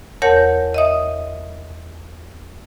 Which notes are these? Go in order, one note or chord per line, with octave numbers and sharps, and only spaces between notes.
E2 A#4 C#5 F#5 A5 G6
D#5 E5 D#6